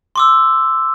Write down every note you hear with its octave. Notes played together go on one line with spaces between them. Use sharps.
C6 D6 E6